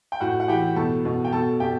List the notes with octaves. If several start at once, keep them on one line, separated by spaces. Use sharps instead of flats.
G5
A2 F#4 F#5
F#5
E3 G4 G5
B2 A4 A5
B2
G5
B2 A4 A5
B2 G4 G5